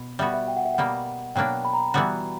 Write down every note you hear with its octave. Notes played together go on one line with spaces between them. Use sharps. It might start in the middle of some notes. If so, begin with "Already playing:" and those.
Already playing: B2
G3 B3 F#4 E5
E5
G5
F#5
E5
B2 G3 A#3 F#5
B2 F#3 A#3 D4 G5
B5
A#5
E3 G3 B3 F#4